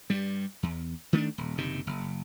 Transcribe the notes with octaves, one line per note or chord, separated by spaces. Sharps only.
G2 G3
E2
D#3 A3 C#4 D4
D#1
F#1 C3 D#3
F#1